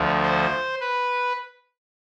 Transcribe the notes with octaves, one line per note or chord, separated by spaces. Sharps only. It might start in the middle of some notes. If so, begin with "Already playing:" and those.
Already playing: D2 D3 F3
C5
B4